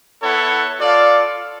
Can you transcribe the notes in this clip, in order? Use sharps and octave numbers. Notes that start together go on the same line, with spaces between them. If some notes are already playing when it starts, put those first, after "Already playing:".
B3 E4 A4 C#5 F#5
F4 A4 D5 F5